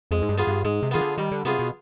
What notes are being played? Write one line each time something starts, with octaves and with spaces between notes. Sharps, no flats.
F2 G#3
G#2
G2
B3 F4 G#4
G2
G#2 G#3
C3
D#3 B3 F4 G#4
D3
D#3 G3
D3
C3 B3 F4 G#4
B2